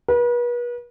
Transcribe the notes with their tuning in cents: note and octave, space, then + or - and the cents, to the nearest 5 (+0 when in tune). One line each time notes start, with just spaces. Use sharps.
B4 -40